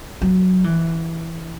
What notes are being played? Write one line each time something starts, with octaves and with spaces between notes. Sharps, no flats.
F#3
E3